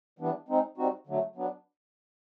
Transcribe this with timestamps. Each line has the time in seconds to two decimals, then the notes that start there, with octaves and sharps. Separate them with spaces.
0.19 E3 G3 B3 D4
0.48 G#3 C4 D#4
0.77 G3 C4 D#4 F#4
1.07 D3 F#3 A3
1.36 F#3 B3 D4